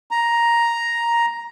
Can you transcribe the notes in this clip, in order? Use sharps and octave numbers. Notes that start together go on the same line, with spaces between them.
A#5